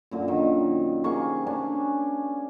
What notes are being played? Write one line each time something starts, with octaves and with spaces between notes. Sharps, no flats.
F#2 A#2 D3
D#3
C3 A#3 G#4 C#6
C#4 D4 G#5